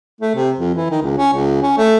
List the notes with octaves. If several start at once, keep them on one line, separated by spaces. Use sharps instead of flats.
A3
C3
F2
E3
D#3
C#2
C#4
C#2
C#4
A3